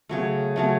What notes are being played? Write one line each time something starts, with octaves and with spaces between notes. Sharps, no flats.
C#3 F#3 A3
C#3 F#3 A3